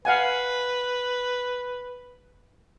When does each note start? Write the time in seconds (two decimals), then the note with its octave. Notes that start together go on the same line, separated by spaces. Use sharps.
0.05 B4 F5 F#5 G#5